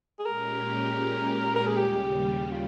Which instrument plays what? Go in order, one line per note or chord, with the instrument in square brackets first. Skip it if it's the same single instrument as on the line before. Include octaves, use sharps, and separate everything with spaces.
[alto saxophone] G#4
[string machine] A#2 G#3 C#4 G4 [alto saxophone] A#4
[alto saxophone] A#4
G#4
[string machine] D#2 C#3 G3 [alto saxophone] G4
[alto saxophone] G4
F4